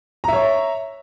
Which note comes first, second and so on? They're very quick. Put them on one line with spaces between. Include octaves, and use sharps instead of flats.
A#5 E5 C#5